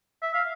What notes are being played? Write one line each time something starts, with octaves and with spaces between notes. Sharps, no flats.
E5
F5